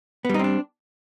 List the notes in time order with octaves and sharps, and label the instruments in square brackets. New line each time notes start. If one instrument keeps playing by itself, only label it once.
[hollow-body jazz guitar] B3
G3
D#4
C4
D4